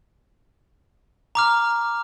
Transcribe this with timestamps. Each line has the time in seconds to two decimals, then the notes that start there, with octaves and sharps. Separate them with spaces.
1.35 A#5 D6 F6